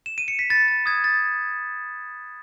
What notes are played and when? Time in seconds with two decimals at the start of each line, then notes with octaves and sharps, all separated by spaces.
0.06 E7
0.18 D#7
0.28 C#7
0.39 B6
0.50 B5 A6
0.68 A6
0.86 D#6 F#6 G#6
1.04 A6